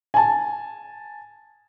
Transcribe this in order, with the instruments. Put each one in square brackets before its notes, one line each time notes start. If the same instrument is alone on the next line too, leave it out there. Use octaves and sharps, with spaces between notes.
[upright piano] G#5 A5